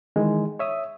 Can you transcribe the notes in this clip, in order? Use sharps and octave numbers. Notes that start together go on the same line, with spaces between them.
D#3 E3 G#3
C#5 E5 D#6